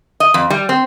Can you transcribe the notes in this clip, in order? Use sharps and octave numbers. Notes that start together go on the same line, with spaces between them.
D#5
F2
G3
C4